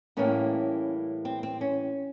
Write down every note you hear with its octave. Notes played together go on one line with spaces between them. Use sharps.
A2 E3 G3 A#3 C#4
C4
C4
C#4